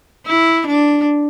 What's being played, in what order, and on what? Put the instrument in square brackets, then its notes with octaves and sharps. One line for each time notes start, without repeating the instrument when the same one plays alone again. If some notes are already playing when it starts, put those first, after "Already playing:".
[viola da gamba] E4
D4